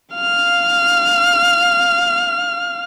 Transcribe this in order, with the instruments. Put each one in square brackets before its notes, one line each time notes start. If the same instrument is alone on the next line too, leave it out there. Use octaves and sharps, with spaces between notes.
[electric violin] F5 F6